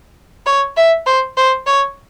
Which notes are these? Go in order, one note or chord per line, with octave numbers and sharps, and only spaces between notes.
C#5
E5
C5
C5
C#5